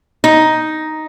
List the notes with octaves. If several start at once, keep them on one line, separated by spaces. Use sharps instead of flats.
D#4